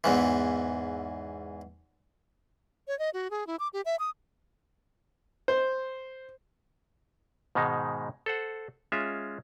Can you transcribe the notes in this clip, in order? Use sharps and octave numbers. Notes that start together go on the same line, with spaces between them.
E2 G#2 E3
C#5
D#5
F#4
G#4
E4
D6
G4
E5
D#6
C5
G#2 B2 D#3 G#3 D#4
A4 C5 F#5
G#3 C#4 F4 E5